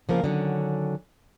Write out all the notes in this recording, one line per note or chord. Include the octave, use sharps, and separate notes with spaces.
C#3 F3 A#3 A#4
D3 D#3 F#3 C#4